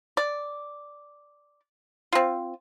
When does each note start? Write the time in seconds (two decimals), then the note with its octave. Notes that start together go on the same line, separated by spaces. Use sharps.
0.17 D5
2.13 C4 F4